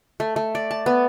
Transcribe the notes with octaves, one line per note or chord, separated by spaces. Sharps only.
A3
A3
D5
A5
B3